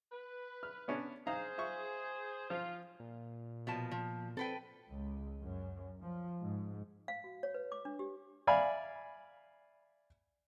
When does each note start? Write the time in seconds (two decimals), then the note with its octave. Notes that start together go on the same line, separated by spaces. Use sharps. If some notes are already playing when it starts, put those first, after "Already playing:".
0.11 B4
0.63 F6
0.88 B3 C#4 D4
1.27 D#4 G#4 C5 F5 A#5
1.58 F4 E5 C#6
2.50 F3 F4
3.00 A#2
3.67 B2 F3 A5
3.91 F3
4.37 C4 A4 B4 G5
4.88 C#2
5.42 F#2
6.01 F3
6.40 G#2
7.08 F5
7.24 F#4
7.43 C#5
7.54 B4
7.72 D6
7.85 D4
7.99 G4
8.47 D5 E5 F5 G#5 B5